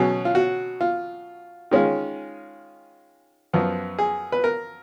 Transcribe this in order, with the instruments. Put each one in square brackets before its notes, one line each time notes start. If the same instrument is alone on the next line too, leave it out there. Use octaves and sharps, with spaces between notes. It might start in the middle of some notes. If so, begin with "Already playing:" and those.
Already playing: [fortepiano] B2 F#3 C#4 G#4
F4
F#4
F4
D#3 G#3 C#4 F4
F#2 F3 B3
G#4
B4
A#4